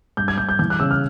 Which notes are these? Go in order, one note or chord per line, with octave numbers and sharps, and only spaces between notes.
G2 G6
G#6
G2 G6
G6
E3 G6
F#6
C#3 E6
F6